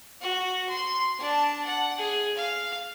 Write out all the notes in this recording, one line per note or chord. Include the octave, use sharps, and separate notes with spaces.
F#4
C6
D4 A5
F#5
G#4
F5